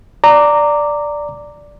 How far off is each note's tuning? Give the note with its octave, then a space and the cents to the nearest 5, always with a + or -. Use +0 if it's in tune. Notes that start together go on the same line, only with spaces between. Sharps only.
D5 +0 A#5 -15 D6 -5